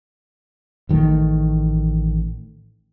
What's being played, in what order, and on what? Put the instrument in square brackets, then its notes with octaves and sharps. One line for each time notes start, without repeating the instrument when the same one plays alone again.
[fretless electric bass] A1 D#3 E3 A3